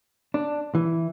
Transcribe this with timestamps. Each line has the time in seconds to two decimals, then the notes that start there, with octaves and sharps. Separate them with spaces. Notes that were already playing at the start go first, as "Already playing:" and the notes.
0.34 D4
0.75 E3